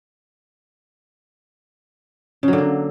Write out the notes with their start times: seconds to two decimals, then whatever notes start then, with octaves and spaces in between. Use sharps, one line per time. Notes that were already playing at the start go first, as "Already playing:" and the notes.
2.43 C#3
2.48 F#3
2.53 D3
2.58 A#3